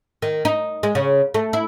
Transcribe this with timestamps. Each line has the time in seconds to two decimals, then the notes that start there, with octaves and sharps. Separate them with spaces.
0.22 D#3
0.45 D#4
0.83 G#3
0.95 C#3
1.34 A3
1.53 E4